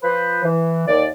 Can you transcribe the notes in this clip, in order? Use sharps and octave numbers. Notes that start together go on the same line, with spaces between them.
F3 B4 C5
E3
D#2 D5